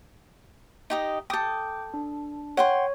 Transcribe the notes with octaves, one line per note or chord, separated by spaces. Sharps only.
D#4 G4 D#5
A4 G5 D6 D#6 G6
D4
C#5 F#5 G5 C6